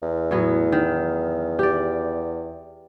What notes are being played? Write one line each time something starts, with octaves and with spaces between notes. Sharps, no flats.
E2
A2 F#3 B3
D#3
G4 D5